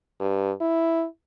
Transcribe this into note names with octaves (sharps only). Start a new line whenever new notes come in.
G2
E4